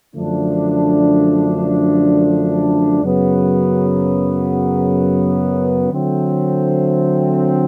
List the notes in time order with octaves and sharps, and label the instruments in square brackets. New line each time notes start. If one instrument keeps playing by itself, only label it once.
[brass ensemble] F#2 D3 F3 A3 D4
F#2 C#3 F#3 B3
D3 F#3 A3 C4